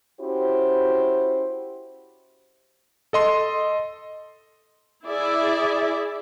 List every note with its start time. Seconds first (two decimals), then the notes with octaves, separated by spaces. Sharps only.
0.20 C#4 E4 F#4 G4 C5
3.13 A4 D#5 C6
5.06 E4 G#4 D5 E5